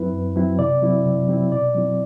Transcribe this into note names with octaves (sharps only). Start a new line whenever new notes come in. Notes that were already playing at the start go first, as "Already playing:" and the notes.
Already playing: F#2 F#3 C4 E4 B4
F#2
F#3 C4 E4
C3 D5
F#3 C4 E4
C3
F#3 C4 E4
B2 D5
F#3 C4 E4